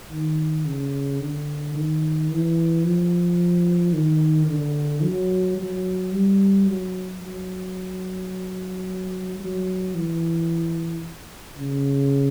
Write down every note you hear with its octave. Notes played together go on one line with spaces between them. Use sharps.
D#3
C#3
D3
D#3
E3
F3
D#3
D3
F#3
F#3
G3
F#3
F#3
F#3
E3
C#3